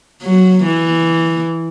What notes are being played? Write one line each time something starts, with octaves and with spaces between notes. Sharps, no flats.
F#3
E3